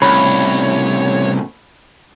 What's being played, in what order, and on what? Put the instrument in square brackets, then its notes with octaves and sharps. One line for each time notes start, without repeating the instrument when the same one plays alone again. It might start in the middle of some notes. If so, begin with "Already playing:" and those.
[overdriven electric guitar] C2 [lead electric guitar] A2 C#3 [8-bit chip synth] C#5 [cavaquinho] B5